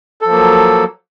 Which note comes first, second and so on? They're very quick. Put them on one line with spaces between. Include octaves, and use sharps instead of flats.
A4 F3 A#3 F#3